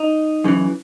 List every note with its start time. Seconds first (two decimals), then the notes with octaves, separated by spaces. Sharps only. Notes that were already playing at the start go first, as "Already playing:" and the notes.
Already playing: D#4
0.44 F#2 C#3 E3